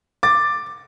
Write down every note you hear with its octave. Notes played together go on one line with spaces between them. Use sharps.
D6 A6